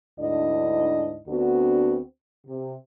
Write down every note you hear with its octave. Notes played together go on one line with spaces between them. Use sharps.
D2 G#2 D4 E4 D#5
D2 B3 C4 D4 F#4
C3